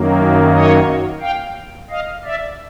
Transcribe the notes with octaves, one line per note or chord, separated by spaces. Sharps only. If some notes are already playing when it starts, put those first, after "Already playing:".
Already playing: F#2 D#3 F#3 A#3
C#5 D#5
F5 G5
D#5 F5
D5 E5